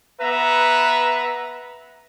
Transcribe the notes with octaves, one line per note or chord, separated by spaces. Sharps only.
B3 B4 E5 A#5